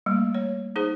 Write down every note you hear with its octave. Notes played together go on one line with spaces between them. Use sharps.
G3 A3 A#3
C#5
D#4 G#4 C5